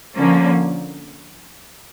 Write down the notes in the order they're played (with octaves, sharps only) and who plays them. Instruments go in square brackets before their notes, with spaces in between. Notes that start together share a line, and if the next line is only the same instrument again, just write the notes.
[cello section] D3 F3 A#3 C#4